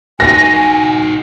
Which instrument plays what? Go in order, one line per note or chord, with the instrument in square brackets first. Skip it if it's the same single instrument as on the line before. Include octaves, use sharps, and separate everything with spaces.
[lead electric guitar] D#4 F#4 [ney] G#5 [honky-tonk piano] A#6